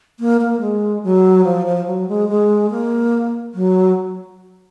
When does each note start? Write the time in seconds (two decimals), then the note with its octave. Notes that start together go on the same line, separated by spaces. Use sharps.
0.20 A#3
0.41 A#3
0.61 G#3
1.04 F#3
1.44 F3
1.66 F3
1.86 F#3
2.08 G#3
2.29 G#3
2.70 A#3
3.54 F#3